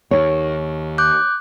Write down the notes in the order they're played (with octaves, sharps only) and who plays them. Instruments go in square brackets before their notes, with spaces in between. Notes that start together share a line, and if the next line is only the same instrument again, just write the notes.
[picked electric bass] D#2 [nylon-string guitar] C#5
[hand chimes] D6 F#6 G6